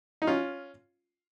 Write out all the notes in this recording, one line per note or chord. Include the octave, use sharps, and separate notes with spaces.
D#4
C#4 F4